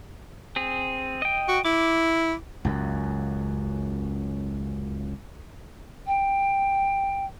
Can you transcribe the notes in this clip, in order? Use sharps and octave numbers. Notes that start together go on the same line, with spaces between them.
C4 G#4
D#5 G5
F#4
E4 D6
C#2 F#2
G5